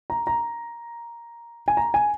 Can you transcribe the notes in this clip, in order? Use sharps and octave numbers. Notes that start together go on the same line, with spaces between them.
A#5
A#5
G#5
A#5
G#5